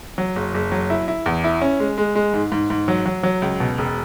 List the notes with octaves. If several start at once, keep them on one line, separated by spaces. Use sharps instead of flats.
F#3
F#1
F#1
F#3
E4
E4
E2
E4
C#4
G#3
G#3
G#3
G#2
G#2
G#2
F#3
F#3
F#3
C#2
B2
E1